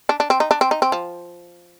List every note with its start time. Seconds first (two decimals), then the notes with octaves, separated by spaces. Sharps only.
0.09 D4
0.20 D4
0.30 C4
0.40 D#4
0.51 D4
0.61 C4
0.71 D#4
0.82 C4
0.92 F3